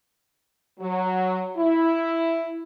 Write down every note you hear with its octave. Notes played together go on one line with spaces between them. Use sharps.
F#3
E4